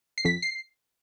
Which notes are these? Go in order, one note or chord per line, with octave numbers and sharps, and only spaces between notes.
C7
F2 B6
C7